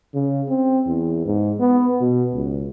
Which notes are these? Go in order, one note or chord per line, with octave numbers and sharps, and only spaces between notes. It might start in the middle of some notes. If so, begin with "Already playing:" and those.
C#3
C4
E2
G#2
B3
B2
C#2